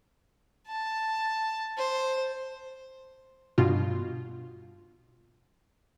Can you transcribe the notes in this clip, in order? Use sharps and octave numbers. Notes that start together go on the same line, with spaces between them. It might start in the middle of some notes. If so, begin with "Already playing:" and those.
A5
C5
G2 B2 F4